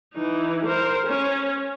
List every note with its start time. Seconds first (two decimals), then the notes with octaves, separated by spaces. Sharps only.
0.14 E3 D#4
0.66 A#4 C5
1.07 C#4